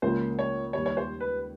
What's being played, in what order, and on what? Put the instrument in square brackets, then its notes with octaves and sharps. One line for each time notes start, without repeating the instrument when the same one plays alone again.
[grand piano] C#2 C#3 F3 A#3 [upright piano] C5
[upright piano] C#5
[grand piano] D#2 D#3 G3 [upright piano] C#5
[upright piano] C#5
C5
B4